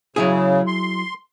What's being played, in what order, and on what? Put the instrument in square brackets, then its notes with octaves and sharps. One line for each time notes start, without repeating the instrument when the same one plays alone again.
[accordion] C#3 [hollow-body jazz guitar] F#3 E4 G#4
[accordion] C6